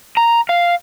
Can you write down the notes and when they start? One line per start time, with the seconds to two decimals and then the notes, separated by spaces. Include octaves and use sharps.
0.17 A#5
0.49 F5